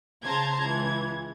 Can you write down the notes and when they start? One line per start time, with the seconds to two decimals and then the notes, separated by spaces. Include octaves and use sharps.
0.23 C#3 C5 A5 A#5 C6 G#6
0.60 C#2 E3 G#6